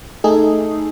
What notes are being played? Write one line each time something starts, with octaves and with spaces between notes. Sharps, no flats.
A3 D#4 G#4 A4